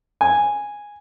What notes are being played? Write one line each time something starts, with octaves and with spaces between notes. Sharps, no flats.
G#5